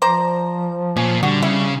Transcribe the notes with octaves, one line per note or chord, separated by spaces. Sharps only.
F3 C5 D5 A#5
A#2 C#4
D3 G3 F#4
C#3 E4